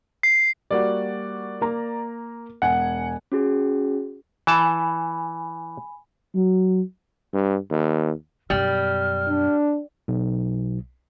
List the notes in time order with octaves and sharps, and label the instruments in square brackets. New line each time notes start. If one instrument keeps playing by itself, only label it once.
[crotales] C7
[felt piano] G3 A#3 F#4 [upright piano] D5
[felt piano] A#3 A#5
[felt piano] E1 G#5 [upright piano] F#5
[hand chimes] C#4 F#4 G#4
[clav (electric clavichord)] E3 A5 [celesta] G#5 B5
[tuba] F#3
[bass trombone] G2
D#2
[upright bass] F#2 B2 [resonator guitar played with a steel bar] G3 [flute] F6
[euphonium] D4
[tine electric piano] B1